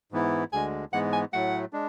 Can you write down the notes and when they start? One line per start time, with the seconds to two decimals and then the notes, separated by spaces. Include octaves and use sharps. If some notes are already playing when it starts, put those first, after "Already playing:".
0.12 G#2 E3 B3 E4
0.52 D2 D3 G#3 G#5
0.93 G#2 E3 G#3 B3 F#5
1.13 G#5
1.33 A2 F#3 A3 F#5
1.73 G#3 D4